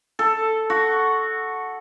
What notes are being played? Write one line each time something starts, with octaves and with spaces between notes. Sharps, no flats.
A4
F#4